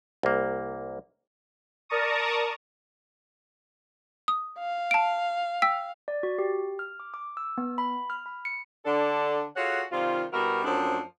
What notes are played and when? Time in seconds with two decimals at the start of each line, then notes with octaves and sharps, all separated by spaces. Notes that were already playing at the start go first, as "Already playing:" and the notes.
0.23 C2 A#3
1.89 A#4 D5 A5 A#5 C#6 D#6
4.28 D#6
4.59 F5
4.91 A5 D7
5.62 G5 E6 B6
6.08 D5
6.23 F#4
6.39 G4
6.79 F6
7.00 D6
7.14 D6
7.37 E6
7.58 B3
7.78 B5
8.10 F6
8.26 B5
8.45 C#7
8.85 D3 D4 A4
9.56 F4 F#4 G#4 A4 C#5 F#5
9.92 C3 D#3 G3 F4
10.32 B2 G3 E4 F#4 A#4
10.64 F#2 F3 A3 C4 D4